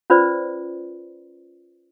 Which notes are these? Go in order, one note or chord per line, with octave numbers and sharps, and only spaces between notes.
C#4 F4 B4 C5 D5